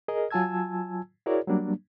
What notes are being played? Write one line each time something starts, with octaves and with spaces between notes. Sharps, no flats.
G#4 A#4 D#5
F#3 F4 G#5 A5 E6 G#6
E4 F#4 G#4 A#4 C#5 D5
F#3 G3 A#3 D4